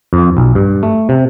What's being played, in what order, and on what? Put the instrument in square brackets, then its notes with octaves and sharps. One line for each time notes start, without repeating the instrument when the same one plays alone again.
[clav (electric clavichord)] F2
B1
G2
A3
C3